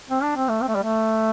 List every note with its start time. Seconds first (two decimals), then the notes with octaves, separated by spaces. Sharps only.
0.10 C4
0.22 D4
0.35 C4
0.48 A3
0.61 C4
0.68 A3
0.75 G3
0.83 A3